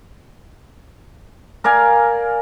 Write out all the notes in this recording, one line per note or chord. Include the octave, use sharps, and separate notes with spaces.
A#4 D5 F5 G#5